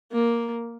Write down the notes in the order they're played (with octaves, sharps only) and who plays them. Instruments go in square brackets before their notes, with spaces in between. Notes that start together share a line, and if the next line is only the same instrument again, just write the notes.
[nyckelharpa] A#3